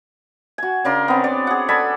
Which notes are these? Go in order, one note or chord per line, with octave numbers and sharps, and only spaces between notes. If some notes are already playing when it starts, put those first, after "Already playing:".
F#4 G#5
C#3 D4 A#4 C6
B3 C4
D5
G#4 F#5
A4 D5 G#5 B5